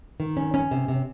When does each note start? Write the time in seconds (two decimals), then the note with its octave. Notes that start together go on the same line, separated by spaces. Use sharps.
0.20 D#3
0.37 C#4
0.54 C#4
0.71 C3
0.88 C3